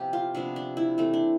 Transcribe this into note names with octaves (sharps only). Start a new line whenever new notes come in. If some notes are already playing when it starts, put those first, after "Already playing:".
Already playing: C3 F3 B3 G4 B4
F4
C3 F3 B3 D4
D4
E4
E3 A3 C4
D4